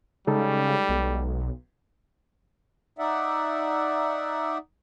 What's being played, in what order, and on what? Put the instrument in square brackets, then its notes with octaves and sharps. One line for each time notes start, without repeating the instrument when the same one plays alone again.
[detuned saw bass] C#3 [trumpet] G3 [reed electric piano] G#3 D#4 A4
[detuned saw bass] B1
[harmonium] D#4 D5 E5 F#5